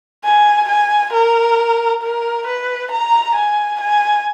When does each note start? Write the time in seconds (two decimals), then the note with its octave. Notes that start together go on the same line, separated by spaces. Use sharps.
0.25 G#5
0.69 G#5
1.13 A#4
2.02 A#4
2.47 B4
2.92 A#5
3.35 G#5
3.81 G#5